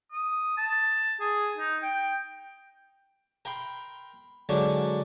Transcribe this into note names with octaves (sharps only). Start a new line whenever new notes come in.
D#6
A5
G#4
D#4
G5
A#4 G5 B5 C6
G#2 D3 F#3 C#4 D4 F#4